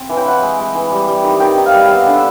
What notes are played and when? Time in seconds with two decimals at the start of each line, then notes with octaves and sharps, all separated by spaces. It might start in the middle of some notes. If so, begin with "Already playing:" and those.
Already playing: C4
0.09 E3
0.16 G5
0.26 E3 F#5
0.38 G#3 G5
0.59 G#3
0.75 E3
0.92 G3
1.08 G3
1.23 D#3
1.40 D#3 G5
1.57 D#3
1.66 F5
1.73 G3
1.86 B3 E5 F5
2.06 D3
2.14 E5